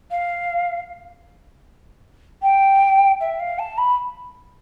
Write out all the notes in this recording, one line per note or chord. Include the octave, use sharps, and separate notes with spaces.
F5
G5
E5
F5
A5
B5